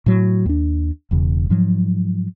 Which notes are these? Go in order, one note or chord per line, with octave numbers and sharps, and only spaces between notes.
A2 F#3
D#2 D4
E1 E2 C#3
G#2 F3 F#3